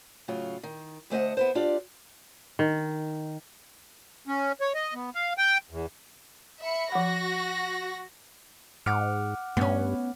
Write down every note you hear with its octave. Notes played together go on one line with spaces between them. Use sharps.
A2 C#3 F#3 F4
D#3
D2 A3 C5 D#5 F#5
B3 E4 C5
D4 F4 G4 D5
D#3
C#4
C#5
D#5
B3
F5
G5
E2
E5 B5 C#7
F3 F#4 F#5 A#6
G#2 F#5 D6 F6
G2 B3 C#4